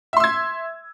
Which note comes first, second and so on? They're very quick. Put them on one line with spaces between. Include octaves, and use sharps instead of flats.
E5 C6 E6 G#6